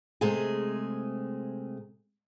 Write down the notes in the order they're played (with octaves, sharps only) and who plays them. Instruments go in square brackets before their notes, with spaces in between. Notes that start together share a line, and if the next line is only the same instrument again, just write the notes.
[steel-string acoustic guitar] C3 G#3 A3 G#4